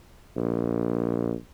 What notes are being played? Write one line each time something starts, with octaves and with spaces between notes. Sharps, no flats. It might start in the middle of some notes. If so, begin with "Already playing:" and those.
A#1